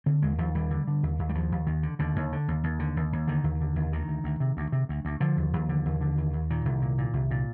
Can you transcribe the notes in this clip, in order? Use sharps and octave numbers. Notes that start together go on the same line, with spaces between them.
D3 C4
D#2 G#3
D#2 F3
D#2 G3
D3
D3
D#2
D#2
G3
D#2 F3
D#2
D#2 D#3
D3
D#2 D3
D#2
D3
D#2
D#2
D3
D#2
D#2
D3 D#3
D#2
D3
D#2
D2 D#3
D2
D2
C3
D2
C3
D2
D2
D3 F3
D#2
D#2
D3
D#2
D3
D#2
D#2
A#2 D#3
C2
A#2
A#2
C2
A#2